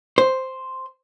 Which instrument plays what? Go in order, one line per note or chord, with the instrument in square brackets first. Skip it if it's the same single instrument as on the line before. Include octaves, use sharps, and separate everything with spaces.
[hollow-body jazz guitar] C5